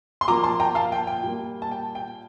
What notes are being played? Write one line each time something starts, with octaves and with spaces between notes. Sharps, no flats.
C6
A#2 F3 A#3 A#5 D6
A5 C6
G5 A#5
F5 A5
G5
G5
A#2 G3 A#3
A5
G5
G5